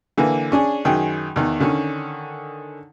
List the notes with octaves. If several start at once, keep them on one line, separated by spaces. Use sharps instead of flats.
D3 E3 A#3
C#4 D4 G#4
F#2 D#3 G#4 G5
E2 D#3
D3 D#3 C#4